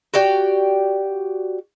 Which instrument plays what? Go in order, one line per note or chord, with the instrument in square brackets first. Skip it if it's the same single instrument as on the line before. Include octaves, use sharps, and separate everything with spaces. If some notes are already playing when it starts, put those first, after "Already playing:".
[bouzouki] F#4 G4 D5 G5